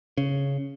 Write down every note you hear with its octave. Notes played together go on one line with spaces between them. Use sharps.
C#3